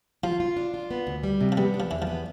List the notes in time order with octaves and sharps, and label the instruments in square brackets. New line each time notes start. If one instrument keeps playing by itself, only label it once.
[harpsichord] F3 [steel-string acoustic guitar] F4
[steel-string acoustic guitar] F4
D4
F4
B3
D2
G3
C3
[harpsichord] F3
[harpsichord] G3 [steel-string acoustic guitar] B3
[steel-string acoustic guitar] D4
[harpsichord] F3
[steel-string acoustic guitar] E2 [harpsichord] E3
[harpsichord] F3 [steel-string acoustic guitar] B3